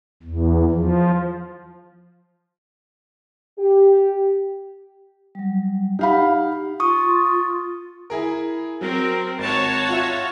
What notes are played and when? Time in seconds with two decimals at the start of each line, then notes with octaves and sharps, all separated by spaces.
0.23 E2
0.71 F3
3.59 G4
5.35 F#3 G3
5.99 D#4 G4 F5 F#5 B5
6.80 F4 C#6 D#6
8.10 E4 G#4 A#4
8.81 F#3 C4 A#4
9.39 G#1 F#4 C#5 A5
9.89 F4 E5